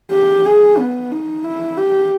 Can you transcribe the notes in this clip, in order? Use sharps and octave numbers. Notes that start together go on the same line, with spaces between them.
G4
G#4
B3
D#4
E4
G4